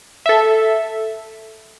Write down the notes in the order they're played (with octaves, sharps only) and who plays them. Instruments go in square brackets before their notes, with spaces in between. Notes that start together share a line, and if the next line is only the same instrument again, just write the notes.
[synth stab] A4 E5